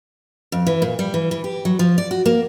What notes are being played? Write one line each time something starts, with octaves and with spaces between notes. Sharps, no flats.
F2
E3
A#2
G3
E3
E3
G4
F#3
F3
D5
F#4
A#3